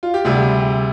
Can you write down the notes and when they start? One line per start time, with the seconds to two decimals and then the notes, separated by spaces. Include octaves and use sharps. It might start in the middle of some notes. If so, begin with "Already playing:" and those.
0.03 F4
0.14 G4
0.25 D2 C3 G3 G#4